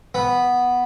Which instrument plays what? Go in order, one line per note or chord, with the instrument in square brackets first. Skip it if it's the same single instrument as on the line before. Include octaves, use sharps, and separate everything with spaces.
[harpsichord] B3